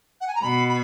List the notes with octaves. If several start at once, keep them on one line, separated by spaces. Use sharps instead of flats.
F#5
G#5
A#5
B2 B5
B5